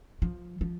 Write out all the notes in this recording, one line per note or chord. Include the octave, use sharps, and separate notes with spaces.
F3
F3